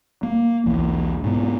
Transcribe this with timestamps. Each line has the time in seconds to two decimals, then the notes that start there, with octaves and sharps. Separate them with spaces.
0.23 A#3
0.66 B1 E2
1.24 G#2 B2